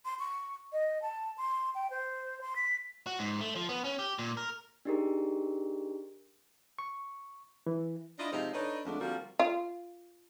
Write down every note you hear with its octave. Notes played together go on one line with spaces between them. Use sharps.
C6
C#6
D#5
A5
C6
G5
C5
C6
B6
F#4
G#2
A3
F3
B3
C#4
G4
A#2
A#4
D4 D#4 G4 G#4 A#4
C#6
E3
D4 E4 F4 D#5
C3 F3 G#3 D#4 C5
D4 D#4 A4 B4 C#5 D#5
F2 D3 G#3 A3 D4
D3 F3 G3 A#3 C4 F#4
F4